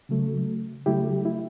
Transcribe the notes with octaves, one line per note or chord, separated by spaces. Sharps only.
C#3 F#3 A3
C#3 F#3 A3 E4 G4
E4